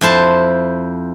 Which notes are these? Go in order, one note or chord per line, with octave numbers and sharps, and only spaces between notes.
F2 E4 C5 A5